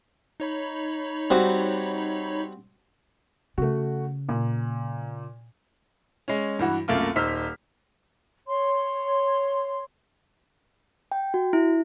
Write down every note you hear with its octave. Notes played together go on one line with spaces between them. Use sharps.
D#4 C#5 B5
G3 C4 F#4
C#3 A3 F#4
A#2
G#3 C#4
G2 E3 F#4
C2 F#2 A3 A#3 F4
D#1 D#4 C5 E6 F6 B6
C#5 C6
G5
F#4
E4